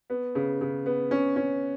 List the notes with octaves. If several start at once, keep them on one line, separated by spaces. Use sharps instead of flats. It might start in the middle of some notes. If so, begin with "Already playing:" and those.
B3
C#3
C#3
B3
C#4
C#4